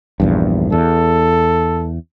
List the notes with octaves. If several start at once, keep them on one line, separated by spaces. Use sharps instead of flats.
A#1 E2 G2
E2 A4